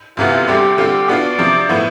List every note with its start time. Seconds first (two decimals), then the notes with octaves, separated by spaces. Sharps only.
0.17 D2 C3 E3 B3 F4
0.48 D2 D3 G3 C4 G4
0.78 D3 G3 C4 F4
1.08 B2 B3 D4 F4 D5
1.39 C3 F3 C4
1.69 A2 F3 B3 E4